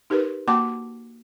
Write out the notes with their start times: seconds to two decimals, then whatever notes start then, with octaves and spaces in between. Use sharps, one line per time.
0.10 D#4 G4 A#4 B4
0.48 A#3 F#4 G5 A5 C6 D6